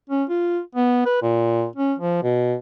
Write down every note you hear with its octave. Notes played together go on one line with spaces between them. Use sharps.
C#4
F4
B3
B4
A#2
C#4
F3
B2